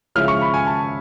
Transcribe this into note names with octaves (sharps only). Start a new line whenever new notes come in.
C#3 F3 G#3 C#4 E4 F6
C#6
B5
G#5
A5